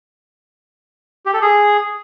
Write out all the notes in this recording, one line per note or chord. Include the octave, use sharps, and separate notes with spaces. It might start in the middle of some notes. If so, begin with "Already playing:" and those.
G4
A4
G#4